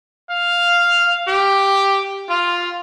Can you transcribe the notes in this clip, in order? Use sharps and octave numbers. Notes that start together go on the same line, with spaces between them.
F5
G4
F4